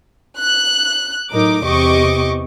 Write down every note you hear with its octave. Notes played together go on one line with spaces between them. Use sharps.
F#6
A2 F#3 D#4 A#4 D6
E2 C3 G4 D#5 C#6 D6